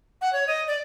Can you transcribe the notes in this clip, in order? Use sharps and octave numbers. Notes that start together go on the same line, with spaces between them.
F#5
C#5
D#5
D5